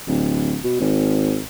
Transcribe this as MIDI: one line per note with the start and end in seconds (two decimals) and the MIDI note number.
0.07 0.57 26
0.64 0.76 47
0.80 1.40 32